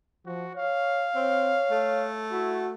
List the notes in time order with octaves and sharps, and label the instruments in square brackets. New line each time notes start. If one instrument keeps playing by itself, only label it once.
[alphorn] F3 [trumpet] F#4
[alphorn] C#5 [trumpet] F5
[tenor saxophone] C4 [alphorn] C#5
[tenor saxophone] A3
[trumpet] E4 [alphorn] F#4